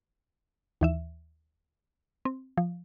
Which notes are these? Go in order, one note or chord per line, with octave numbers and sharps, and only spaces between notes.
D#2 E3 E5
C4
F3